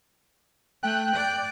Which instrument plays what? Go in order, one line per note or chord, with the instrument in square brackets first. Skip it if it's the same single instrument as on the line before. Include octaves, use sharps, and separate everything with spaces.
[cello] A3 [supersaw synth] G5 F#6
[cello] D5